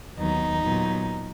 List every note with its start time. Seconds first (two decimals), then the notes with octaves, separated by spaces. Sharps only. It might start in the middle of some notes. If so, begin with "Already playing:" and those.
0.18 D#2 D#3 F#3 B3 D#4
0.62 A#2 F#3 B3